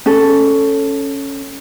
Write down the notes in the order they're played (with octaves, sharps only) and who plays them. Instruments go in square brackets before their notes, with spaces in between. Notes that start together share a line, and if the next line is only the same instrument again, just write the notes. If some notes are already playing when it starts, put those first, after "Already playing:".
[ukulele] C#4 A4